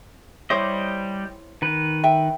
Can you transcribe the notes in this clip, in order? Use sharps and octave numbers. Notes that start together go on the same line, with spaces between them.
G3 E4 G4 C5 C#5 D#5
D#3 B4
E5 G5